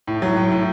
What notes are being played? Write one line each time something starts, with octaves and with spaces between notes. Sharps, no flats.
A2
F#3
A2
A2